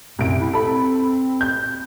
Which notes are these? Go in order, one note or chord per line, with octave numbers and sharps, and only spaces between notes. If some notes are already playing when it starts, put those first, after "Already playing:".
C2 F#2 D7
E4
C4 A4 B5
G6